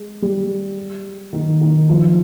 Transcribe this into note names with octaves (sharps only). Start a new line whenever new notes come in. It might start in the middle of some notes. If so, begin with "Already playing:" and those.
Already playing: G#3
G3
D#3
D#3
F3